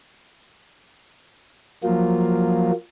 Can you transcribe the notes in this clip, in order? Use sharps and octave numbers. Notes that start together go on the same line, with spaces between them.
F3 F#3 A#3 F4